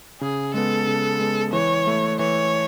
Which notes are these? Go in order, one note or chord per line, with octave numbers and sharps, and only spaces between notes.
C#3 G#4
G#3 B3 A4
C#3
G#3 B3
E3 C#5
A3 E4
E3 C#5